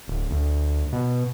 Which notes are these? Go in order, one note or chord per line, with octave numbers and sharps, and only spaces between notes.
D1
D2
B2